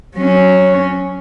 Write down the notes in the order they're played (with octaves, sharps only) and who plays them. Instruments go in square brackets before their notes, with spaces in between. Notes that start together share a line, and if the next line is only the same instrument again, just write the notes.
[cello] F#3 C#4